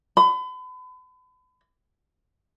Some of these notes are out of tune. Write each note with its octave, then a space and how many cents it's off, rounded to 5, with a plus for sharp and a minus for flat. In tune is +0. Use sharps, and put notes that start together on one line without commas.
B5 +40